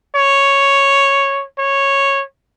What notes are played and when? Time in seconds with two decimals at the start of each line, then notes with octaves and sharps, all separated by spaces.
0.16 C#5
1.59 C#5